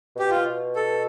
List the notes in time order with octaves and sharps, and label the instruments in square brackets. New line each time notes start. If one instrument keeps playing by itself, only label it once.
[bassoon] B2 [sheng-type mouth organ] G4
[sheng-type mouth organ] F4
[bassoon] B2
[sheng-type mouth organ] A4